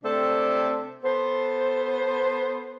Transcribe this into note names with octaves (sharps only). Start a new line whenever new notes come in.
C3 A3 C4 D4 A4
B3 A4 C5